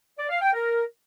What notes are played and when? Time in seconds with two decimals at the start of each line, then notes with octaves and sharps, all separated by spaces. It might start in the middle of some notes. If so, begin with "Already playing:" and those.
0.18 D5
0.30 F5
0.42 G5
0.54 A#4